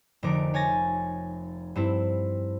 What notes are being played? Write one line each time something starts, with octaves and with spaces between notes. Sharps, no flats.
F1 D3 D#4 A#4 D6
C#5 G#5 A6 A#6
G2 C4 E4